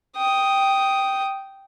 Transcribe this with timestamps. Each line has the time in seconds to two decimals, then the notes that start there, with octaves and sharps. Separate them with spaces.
0.16 G5 D#6